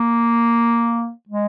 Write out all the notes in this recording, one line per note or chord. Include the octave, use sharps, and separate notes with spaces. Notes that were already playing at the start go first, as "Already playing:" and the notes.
Already playing: A#3
G#3